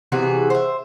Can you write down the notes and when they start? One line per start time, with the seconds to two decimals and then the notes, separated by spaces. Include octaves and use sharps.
0.12 C3 E3 F#4 G#4
0.50 C5 E5